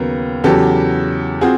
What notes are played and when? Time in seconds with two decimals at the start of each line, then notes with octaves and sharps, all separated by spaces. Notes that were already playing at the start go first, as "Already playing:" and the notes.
Already playing: D#2 C#3 F#3 B3 A#4
0.44 E2 C#3 F#3 G4 A4
1.41 C4 F4 F#4 G#4